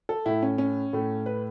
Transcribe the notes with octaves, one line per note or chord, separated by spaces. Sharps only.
A4
A2 A3 E4
C#4
C#4
A2 A3
B4